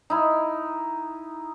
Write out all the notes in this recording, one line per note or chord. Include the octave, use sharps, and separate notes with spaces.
D#4 E4